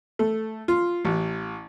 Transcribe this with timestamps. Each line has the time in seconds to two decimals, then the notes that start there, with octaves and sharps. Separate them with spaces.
0.19 A3
0.68 F4
1.05 A1